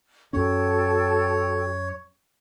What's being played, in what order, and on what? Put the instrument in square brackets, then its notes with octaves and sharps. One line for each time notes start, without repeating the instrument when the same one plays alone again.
[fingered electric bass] F#2 C#4 [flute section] F#4 A4 G5 [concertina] C#5